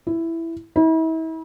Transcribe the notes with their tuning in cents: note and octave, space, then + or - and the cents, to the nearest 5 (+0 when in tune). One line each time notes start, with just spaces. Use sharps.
E4 +5
E4 -40